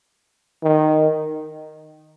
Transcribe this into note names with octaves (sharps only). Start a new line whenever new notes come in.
D#3